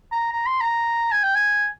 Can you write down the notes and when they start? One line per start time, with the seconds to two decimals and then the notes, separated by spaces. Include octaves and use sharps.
0.12 A#5
0.32 A#5
0.46 C6
0.61 A#5
1.11 G#5
1.24 G5
1.35 G#5